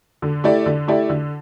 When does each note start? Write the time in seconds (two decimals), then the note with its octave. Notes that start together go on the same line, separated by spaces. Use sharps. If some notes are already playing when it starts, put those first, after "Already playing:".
0.22 D3
0.44 A3 E4 G4 D5
0.66 D3
0.88 A3 E4 G4 D5
1.09 D3